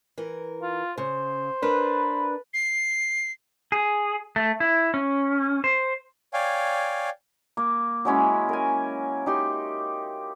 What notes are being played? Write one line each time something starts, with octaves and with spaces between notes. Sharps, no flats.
E3 A#4
F4
C#3 C5
D4 A#4 B4
C7
G#4
A3
E4
C#4
C5
C#5 D5 F5 G5 G#5
A#3
F#3 G#3 C#4 E4
A#4 G#5
D#4 G4 C6